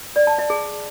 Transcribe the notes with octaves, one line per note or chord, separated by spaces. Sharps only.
D5
A5
E5
G#4